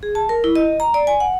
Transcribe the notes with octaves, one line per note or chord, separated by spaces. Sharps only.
G#4
A5
A#4
E4
D#5
A#5
D5
G#5
F#5